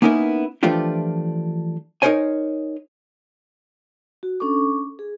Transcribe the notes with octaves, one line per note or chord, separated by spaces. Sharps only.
A#3 B3 C#4 D#4 E4 A#4
E3 F3 A3 D4 F4 G4
D#4 F4 A#4 C5 C#5 G#5
F#4
C#4 D4 A4 C#6 D6
G#4